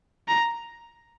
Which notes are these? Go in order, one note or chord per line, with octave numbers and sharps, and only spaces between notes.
A#5